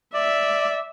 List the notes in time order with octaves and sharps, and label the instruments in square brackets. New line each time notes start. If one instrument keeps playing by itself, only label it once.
[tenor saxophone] D5 [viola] E5